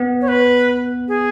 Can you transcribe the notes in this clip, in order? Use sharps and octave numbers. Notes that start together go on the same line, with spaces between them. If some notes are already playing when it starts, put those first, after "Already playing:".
Already playing: B3
C#5
B4
G#4